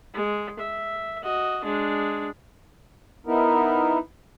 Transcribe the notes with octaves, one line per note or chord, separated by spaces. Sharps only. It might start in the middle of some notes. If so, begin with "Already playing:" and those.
G#3
E5
F#4 D#5
G#3 D4
B3 D#4 E4 A#4